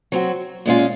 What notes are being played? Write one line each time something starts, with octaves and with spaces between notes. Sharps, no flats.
F#3 C4 F#4
A#2 G#3 C#4 F4